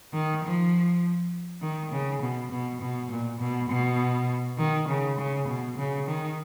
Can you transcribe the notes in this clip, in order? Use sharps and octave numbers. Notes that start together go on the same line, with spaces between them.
D#3
F3
D#3
C#3
B2
B2
B2
A#2
B2
B2
D#3
C#3
C#3
B2
C#3
D#3